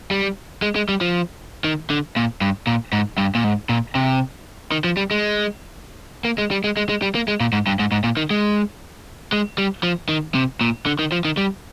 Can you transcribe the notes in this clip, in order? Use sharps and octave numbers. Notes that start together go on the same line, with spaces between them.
G3
G#3
G#3
G3
F3
D#3
D3
A#2
G2
A#2
G#2
G2
A#2
G#2
A#2
C3
D#3
F3
G3
G#3
A#3
G#3
G3
G#3
G#3
G#3
G3
A#3
G#3
A#2
G#2
G2
G#2
G#2
A#2
D#3
G#3
G#3
G3
F3
D#3
C3
A#2
D3
D#3
F3
D#3
G3